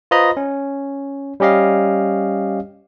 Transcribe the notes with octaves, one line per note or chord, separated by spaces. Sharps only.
F4 B4 C5 D#5 A#5 B5
C#4
G3 C#4 G4 D#5 F5